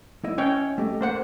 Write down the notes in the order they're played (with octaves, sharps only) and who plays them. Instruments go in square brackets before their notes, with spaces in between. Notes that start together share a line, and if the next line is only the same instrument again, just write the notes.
[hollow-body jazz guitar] E4 D#5 E5
[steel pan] C#4 C#5 G5
[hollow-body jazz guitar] A3 G4 D#5
[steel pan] A#3 C5 F#5